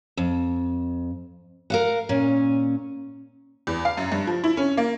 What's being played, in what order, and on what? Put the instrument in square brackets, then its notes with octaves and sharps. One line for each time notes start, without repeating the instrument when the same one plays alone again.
[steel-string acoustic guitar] F2
A#4 F5 F#5
A#2 C#4
[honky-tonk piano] E2
F5
F#2
G2
F3
E4
C#4
A#3